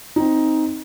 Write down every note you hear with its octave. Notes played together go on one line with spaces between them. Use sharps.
C4 D#4